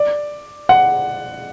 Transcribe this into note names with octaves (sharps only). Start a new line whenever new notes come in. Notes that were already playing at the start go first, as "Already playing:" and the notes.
Already playing: D5
F#5